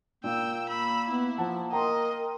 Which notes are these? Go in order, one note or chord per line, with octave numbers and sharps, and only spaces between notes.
A#2 A#3 G5 E6
B5 E6
B3 E4
F3 F#5 A5
A#4 D#5 G5 A#5 C6